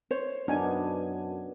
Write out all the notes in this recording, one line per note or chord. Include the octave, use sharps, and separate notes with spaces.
C5 C#5
F#2 B3 D4 D#4 G#5